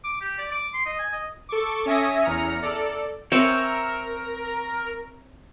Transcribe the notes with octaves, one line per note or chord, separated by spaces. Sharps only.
D6
G4
D5
D6
C6
D#5
G#5
D#5
A4 C#6 D6
C#4 E5 G#5 D#6 A#6
E2 A#5 F6 C#7
A4 D5
C4 A#4 C#5 E5 G5 G#5